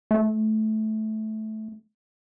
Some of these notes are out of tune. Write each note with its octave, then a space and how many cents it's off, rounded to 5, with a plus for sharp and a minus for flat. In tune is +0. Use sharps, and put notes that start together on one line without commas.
A3 -15